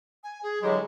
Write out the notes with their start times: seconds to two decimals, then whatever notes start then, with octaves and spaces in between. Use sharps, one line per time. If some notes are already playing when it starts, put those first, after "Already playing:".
0.24 G#5
0.43 G#4
0.62 D3 E3 F#3 G#3 G4